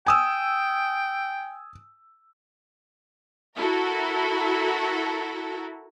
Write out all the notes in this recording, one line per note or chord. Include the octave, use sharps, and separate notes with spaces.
G5 G#5 D#6 E6
E4 F#4 A4 A#4